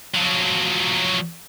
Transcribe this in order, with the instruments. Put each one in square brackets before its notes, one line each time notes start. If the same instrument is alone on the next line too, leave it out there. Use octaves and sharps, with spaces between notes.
[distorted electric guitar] F3 F#3